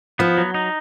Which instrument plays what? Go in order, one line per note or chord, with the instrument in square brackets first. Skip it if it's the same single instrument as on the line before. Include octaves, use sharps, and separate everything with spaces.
[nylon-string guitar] F3 [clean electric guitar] B3
[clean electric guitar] F#3
D#4